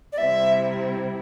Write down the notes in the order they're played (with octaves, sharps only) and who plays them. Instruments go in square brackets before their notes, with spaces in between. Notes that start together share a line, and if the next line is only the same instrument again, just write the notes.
[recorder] D5
[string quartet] C3 G3 C4 E4 [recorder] E5